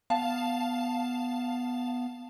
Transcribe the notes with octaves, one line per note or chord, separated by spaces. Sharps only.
B3 F5 A5